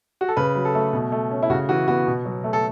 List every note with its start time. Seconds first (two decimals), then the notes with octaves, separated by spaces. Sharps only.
0.21 F#4
0.28 A4
0.37 C#3 B4
0.55 F#3
0.65 A4
0.75 A3
0.93 B2
1.12 A3
1.31 C#4
1.43 E4
1.50 C#3 F#4
1.69 E3 F#4
1.88 B3 F#4
2.07 B2
2.26 F#3
2.44 A3
2.53 A4